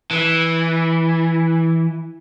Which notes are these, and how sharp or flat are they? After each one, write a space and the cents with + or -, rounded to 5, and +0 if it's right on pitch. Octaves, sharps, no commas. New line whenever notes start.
E3 -5